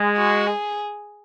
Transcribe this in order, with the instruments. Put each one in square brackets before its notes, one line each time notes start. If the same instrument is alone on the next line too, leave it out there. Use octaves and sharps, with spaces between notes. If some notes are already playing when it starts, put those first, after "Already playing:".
Already playing: [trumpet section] G#3
[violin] F#4
G#4